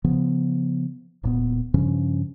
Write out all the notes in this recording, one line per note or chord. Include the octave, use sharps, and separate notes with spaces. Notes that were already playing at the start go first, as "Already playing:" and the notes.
C#3 F3 B3
D1 A#2 B3
G2 C#3 F3 C#4